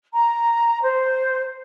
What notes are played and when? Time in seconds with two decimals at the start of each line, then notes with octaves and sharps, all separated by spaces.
0.12 A#5
0.81 C5